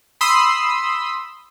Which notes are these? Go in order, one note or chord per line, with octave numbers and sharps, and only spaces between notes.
B5 C6 D#6 E6